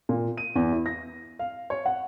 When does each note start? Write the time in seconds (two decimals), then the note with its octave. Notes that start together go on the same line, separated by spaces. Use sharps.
0.09 A#2
0.37 D#7
0.56 E2
0.72 E4
0.86 A#6
1.39 F5
1.70 C#5
1.86 F#5